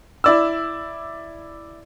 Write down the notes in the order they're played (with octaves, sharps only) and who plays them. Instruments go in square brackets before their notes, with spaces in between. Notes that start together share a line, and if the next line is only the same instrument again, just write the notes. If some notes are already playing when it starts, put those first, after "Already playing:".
[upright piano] E4 D5 E6